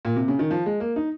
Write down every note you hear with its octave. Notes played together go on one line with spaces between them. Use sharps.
A#2
C3
C#3
D#3
F3
G#3
A#3
D#4